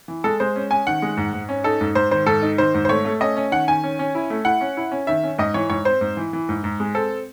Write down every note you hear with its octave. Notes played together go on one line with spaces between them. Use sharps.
E3
G#3 A4
G#3 C5
C#4
C#4 G#5
D#3 F#5
G#3
G#2
G#2
C#4
D#4 A4
G#2
G#2 C5
D#3 C5
G#2 A4
D#4
D#3 C5
G#2
C5
A3 C#5
A3
C#4 D#5
C#4
D#3 F#5
D#3 G#5
C#4
C#4
E4
A3
E4 F#5
C#4
E4
C#4
D#3 E5
C#4
G#2 D#5
E3 C#5
G#2 C#5
C4 C5
G#2
E3
E3
G#2
G#2
G#3
C4 A4